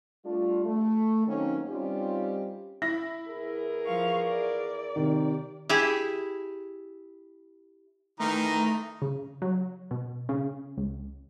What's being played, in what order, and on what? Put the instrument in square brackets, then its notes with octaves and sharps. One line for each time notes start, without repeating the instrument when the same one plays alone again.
[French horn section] G3 A3 D4 F4
A3
D#3 F#3 A#3 C4 C#4
G3 C4 C#4 D#4 F4 G4
[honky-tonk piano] E4 [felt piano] A#6
[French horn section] E2 G#4 A#4
[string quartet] F3 F5 C#6
D5
[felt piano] C3 D#3
[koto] E4 G4 G#4
[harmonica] D#3 E3 D#4 [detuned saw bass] A3 [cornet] A#5
[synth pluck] C#3
F#3
B2
C#3
C#2